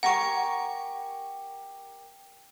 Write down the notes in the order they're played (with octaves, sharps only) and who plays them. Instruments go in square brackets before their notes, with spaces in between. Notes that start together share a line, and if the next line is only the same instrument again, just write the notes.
[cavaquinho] G4 A#4 G#5 [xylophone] F#5 C#6